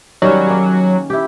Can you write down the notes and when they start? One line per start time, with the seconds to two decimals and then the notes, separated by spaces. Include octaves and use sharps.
0.22 D#3 F#3 G3 C#4
0.47 A#3 G#4
1.10 E4 G4